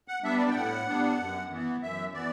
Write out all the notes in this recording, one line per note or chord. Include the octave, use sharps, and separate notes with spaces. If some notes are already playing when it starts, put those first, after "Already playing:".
F#5
G3 B3 D4 E5
D5
G5
A2 F#5
G3 B3 D4
F#2
E3 B3
F#2 E5
E3 B3 D5